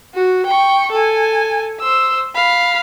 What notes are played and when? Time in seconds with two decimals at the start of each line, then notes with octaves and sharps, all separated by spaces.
0.14 F#4
0.46 G5 C#6
0.92 A4 G#5
1.80 C5 E6
2.35 F5 B5